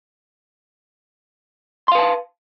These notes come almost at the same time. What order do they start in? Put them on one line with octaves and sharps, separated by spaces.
C6 F5 B4 A5